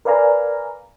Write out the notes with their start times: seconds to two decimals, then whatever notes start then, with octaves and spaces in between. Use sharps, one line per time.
0.05 A#4 B4 D5 F5 G#5 A#5